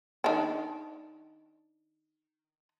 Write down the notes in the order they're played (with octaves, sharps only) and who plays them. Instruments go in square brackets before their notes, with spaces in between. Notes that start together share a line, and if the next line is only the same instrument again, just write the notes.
[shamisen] D#3 D4